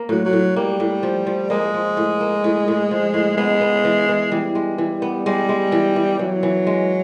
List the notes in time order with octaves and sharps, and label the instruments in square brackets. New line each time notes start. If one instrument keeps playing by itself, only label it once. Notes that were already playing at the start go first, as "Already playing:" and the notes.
Already playing: [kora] A#3
[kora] A2 [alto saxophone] F#3
[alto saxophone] F#3
[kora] A2
[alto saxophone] G3 [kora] A#3
[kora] A2
F3
F3
[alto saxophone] G#3 [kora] A#3
[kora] F3
A2
A#3
A2
A2
F3
A2
[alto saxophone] G#3 [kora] B3
[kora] B3
E3
E3
[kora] E3 [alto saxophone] G3
[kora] G#3
E3
B3
[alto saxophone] G3 [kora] G#3
[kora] G#3
E3
E3
[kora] E3 [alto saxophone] F#3
[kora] E3
G#3